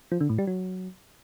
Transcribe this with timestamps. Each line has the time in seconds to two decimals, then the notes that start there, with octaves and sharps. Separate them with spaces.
0.12 F3
0.21 D3
0.30 A2
0.38 G3
0.47 F#3